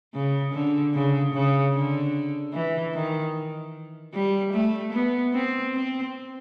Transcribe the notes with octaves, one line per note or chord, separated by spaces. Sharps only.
C#3
D3
C#3
C#3
D3
E3
D#3
G3
A3
B3
C4
C4